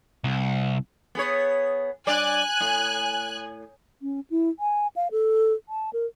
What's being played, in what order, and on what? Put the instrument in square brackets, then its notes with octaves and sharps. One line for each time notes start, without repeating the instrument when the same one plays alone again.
[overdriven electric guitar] C2
[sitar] B3 G#4 C#5
[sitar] G2 D5 [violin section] G#5 F#6
[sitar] A2
[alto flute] C#4
E4
G#5
F5
A4
A5
A#4